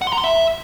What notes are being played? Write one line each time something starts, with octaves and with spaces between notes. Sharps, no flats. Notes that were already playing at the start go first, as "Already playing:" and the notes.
F#5
C6
A#5
C6
E5